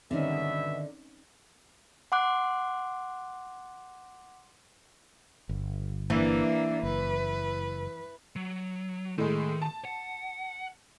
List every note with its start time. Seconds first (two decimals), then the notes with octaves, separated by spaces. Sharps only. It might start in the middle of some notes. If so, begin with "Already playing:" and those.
0.11 G2 B2 D3 D#3 C4 C#4 D#4 E5
2.12 F#5 C6 D6 F#6
5.49 G1
6.10 E3 A#3 D4
6.83 F#1 B4
8.36 F#3
9.18 A2 D#3 G#3
9.62 A5
9.85 F#5